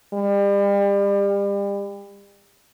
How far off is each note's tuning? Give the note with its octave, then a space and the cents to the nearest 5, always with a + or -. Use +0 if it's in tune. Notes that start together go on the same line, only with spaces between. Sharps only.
G3 +35